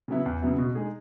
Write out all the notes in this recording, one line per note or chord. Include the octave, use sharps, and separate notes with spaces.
C#3 F#3 B3 E4
E2
C#3 F#3 B3 E4
B2
G#3 D#4 G#4